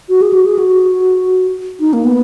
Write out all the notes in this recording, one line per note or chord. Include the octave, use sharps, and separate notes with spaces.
F#4
G#4
F#4
G#4
F#4
D#4
A#3
B3